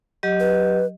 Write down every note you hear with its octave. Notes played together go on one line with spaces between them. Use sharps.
F#3 G4 D#5
B4